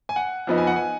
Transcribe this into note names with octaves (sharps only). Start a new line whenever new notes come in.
G#5
F#5
F2 F3 B3 D#4
G#5
F#5
G#5